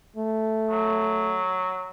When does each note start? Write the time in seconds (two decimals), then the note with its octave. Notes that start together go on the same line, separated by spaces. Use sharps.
0.16 A3
0.70 F#3